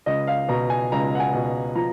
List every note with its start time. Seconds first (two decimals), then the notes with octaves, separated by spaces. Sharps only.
0.06 C#2 D#5
0.27 F5
0.49 B2 A#5
0.70 G#5
0.92 C#2 A#5
1.15 F#5
1.20 G#5
1.33 B2
1.75 F3 A#5